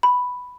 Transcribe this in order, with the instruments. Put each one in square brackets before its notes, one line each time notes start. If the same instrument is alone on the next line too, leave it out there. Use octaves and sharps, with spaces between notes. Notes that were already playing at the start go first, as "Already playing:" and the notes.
[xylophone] B5